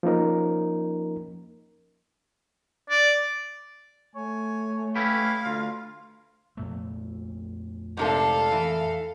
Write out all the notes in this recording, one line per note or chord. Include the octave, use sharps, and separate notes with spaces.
F3 A#3 C#4 D#4 A#4
D5
A3 C#5 G#5
C#4 E4 G4 B4 F5
D2 A3 F4
F2 A#2 A3
G#2 C3 D4 A4 F5
E3